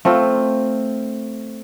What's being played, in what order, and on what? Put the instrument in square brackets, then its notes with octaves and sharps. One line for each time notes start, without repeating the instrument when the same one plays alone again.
[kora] A3 C4 F4